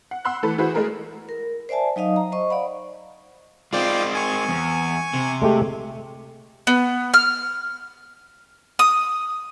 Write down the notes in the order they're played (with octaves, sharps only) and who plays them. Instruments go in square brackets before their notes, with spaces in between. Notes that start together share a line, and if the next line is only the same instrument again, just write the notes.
[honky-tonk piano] F#5
F#5 B5 C6 E6 F#6
E3 A3 A4 B4
E3 E4 F#4 G#4 B4 C5
G#3 A3 G#4 A#4 B4
[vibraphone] A#4
C5 D5 E5 G#5 A5
F#3 D#4 D#5 F5 D#6
A#5
C5 D#5 C#6
D5 F5 F#5 B5
[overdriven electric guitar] G#3 C4 [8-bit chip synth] F4 D5 G5
[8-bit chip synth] G#5 C#6
[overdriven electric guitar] E2
C3
[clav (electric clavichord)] G#3 A3 G4
[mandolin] B3
F6
D#6